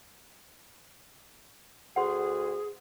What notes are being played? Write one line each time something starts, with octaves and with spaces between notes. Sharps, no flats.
D2 G#4 F#5 C6